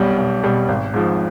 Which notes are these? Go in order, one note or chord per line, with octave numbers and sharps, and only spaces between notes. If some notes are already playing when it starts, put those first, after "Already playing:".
Already playing: B1 B2 G3
B1
B2 G3
G#1
G#2 F3